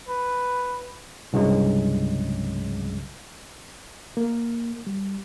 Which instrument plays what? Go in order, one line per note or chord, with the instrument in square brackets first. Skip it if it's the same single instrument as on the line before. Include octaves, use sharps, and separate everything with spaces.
[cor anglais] B4
[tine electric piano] C2 G2 C#3 F#3 G#3
[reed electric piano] A#3
G3